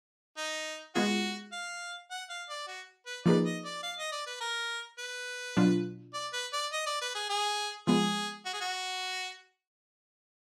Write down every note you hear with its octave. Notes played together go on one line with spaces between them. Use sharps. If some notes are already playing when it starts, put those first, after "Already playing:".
D#4
G#3 B3 F4 F#4 G#4
F5
F#5
F5
D5
F#4
B4
F3 A#3 D#4 G#4 B4 D5
D#5
D5
F5
D#5
D5
B4
A#4
B4
B2 F#3 D4 F4
D5
B4
D5
D#5
D5
B4
G#4
G#4
F3 G#3 B3 G#4
F#4
G#4
F#4